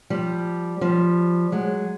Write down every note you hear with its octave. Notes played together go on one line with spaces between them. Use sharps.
F3 G3
F3 G3
F#3 G#3